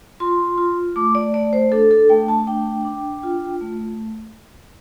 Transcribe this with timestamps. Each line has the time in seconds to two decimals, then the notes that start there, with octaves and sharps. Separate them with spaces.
0.20 F4 C6
0.58 F4
0.96 A3 D6
1.15 D5
1.34 A3 D5
1.53 C5
1.72 D4 A4
1.91 A4
2.09 A3 G5
2.28 A5
2.47 D4 G5
2.85 D4
3.23 F4
3.61 A3